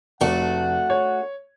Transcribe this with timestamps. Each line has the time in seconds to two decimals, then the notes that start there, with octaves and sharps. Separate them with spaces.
0.21 F1 A3 D4 F#4 F#5
0.90 C#5